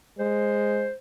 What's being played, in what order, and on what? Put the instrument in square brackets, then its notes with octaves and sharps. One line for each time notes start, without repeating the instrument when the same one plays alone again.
[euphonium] G#3 [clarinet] C5